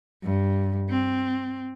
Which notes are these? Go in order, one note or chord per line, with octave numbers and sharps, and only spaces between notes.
G2
C4